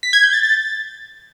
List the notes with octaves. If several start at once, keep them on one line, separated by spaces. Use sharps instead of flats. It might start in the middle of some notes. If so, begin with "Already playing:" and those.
B6
G#6
G6
A6
A6